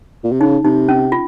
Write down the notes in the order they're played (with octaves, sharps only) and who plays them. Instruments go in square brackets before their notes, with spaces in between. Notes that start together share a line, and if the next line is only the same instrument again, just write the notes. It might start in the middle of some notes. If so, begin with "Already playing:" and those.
[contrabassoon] A#2
C3
[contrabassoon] C#3 [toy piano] D#4
[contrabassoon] C3 [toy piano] D#4
[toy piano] C#4
F4